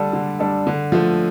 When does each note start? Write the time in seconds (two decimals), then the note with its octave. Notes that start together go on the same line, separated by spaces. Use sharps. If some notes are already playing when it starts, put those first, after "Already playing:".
Already playing: D3 G3 D4 A4
0.13 D3
0.39 G3 D4 A4
0.67 D3
0.92 F3 A3